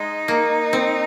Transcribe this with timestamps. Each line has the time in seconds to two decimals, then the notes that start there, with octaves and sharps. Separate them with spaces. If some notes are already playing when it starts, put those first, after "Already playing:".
Already playing: G#3 D#4
0.28 A#3
0.73 C4